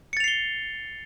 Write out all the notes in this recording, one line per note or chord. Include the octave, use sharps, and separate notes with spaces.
A6 C7 C#7 F7 G7